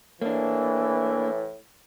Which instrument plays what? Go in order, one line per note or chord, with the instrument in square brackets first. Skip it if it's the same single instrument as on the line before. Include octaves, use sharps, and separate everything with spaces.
[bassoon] A2 [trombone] E3 [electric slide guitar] A#3 D4